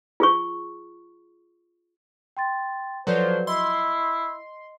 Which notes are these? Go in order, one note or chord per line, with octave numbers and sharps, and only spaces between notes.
F4 G#4 C#6
G5 C6 A6
F3 F#3 A4 B4 C5 D5
E4 D#5 C6